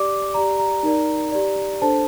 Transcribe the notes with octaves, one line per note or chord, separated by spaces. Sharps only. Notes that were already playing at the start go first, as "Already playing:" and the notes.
Already playing: G4 D5 D6
G4 D5 A#5
A#5
D#4 A#4 D5
G4 D5
D4 A4 C5 A5